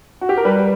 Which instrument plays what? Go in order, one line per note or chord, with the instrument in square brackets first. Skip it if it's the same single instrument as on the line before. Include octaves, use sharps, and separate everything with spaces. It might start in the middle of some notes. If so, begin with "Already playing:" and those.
[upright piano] F#4
G4
A#4
G3 B4